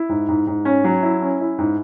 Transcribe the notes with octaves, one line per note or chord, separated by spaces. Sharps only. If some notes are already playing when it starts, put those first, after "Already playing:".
Already playing: E4
G#2
G#2
G#2
C#4
F#3
E4
C#4
E4
G#2